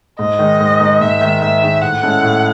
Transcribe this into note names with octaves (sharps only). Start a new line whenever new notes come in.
G#2 D#5
D#3 G#3 D#4
G#2
D#3 G#3 D#4
G#2 E5
D#3 G#3 D#4
G#2 E5
D#3 G#3 D#4
A2 F#5
G#3 C#4 E4 A4
A2